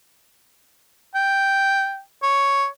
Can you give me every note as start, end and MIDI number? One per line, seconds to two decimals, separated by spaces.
1.15 2.00 79
2.23 2.66 73